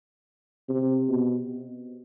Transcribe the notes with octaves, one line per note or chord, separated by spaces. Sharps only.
C3
B2